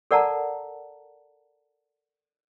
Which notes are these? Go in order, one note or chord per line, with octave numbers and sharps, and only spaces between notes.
A4 A#4 D5 F#5 A5 A#5